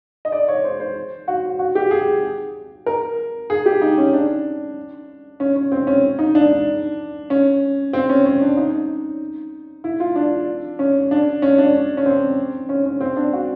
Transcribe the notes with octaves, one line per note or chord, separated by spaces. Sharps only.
D#5
D5
C#5
C5
C5
F#4
F#4
G4
G#4
A#4
G#4
G4
D#4
C#4
D4
C#4
C#4
C4
C#4
D#4
D4
C#4
C4
C#4
C#4
D4
D#4
E4
F4
D4
C#4
D4
C#4
D4
C#4
C4
C#4
C#4
C4
D4
F#4